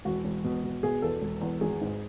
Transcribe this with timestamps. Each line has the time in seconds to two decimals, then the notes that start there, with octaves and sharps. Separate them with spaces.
0.05 E1 F#4
0.25 E1
0.44 B2
0.64 B2
0.83 B2 G#4
1.02 E2 A4
1.22 E1
1.41 E2
1.61 G#1 G#4
1.81 G#2